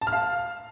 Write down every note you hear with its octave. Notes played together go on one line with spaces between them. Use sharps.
A5
F6
F5